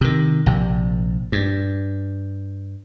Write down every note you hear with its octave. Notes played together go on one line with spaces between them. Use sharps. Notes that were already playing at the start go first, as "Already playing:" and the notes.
C3 D#3
A#1 C3
G2